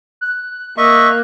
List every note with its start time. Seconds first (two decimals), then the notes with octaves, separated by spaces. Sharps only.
0.21 F#6
0.78 A#3 D#5 E5 C#6